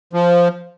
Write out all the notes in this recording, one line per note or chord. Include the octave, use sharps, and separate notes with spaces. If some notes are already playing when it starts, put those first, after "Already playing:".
F3